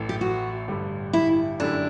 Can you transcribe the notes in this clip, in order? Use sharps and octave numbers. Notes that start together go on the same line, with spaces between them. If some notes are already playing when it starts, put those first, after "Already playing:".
Already playing: A1 A2 E3 A3
G4
F#4
A1 G2 D3 G3
E4
F#2 D3 A3 D4 E4 G4